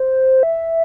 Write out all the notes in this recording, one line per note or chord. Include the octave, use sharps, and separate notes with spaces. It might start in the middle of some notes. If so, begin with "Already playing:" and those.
Already playing: C5
E5